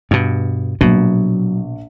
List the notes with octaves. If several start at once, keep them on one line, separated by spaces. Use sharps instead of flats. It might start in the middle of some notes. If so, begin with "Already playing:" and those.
G2 B2
A#1 B2 F#3